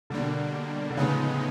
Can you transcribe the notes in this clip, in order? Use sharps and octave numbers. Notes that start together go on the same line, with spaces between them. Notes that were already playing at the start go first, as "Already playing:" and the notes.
B2 D3 G3 A#3 D4
D3
A2 C#3 F3 G#3 B3 D#4